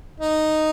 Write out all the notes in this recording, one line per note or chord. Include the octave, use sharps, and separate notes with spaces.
D#4